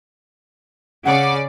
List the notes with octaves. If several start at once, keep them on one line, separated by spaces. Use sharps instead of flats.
C#3 D5 F#5